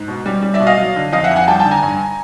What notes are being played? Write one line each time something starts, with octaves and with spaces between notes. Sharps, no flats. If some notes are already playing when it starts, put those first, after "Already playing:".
Already playing: G#2
B2
G3
G3
D5 E5
B2
D#5 F5
F#3
D3
F2 D#5 F5
E5 F#5
F2
F#5 G#5
G3 G5 A5
G5 A5
D3
G#5 A#5
G2